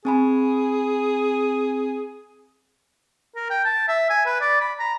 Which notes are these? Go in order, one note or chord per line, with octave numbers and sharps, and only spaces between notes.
C4 G#4 G#5 B5
A#4
G5
A5
E5
G#5
B4
D5
B5
A#5